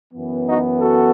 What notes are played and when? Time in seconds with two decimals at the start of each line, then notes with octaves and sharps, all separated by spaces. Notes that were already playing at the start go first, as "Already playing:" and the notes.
0.14 F#2 E3 B3
0.47 D#4 F#4
0.80 F#4 A4